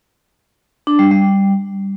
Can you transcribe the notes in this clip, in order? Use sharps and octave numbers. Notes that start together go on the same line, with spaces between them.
D4
G3
G3